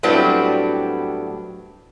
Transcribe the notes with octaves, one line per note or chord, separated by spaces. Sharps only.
A2 F#3 G3 B3 C4 D4